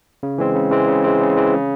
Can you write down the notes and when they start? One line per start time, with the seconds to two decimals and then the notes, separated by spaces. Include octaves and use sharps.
0.23 C#3
0.38 E3 G#3 C4
0.55 C#3
0.71 E3 G#3 C4
0.88 C#3
1.04 E3 G#3 C4
1.21 C#3
1.37 E3 G#3 C4
1.53 C#3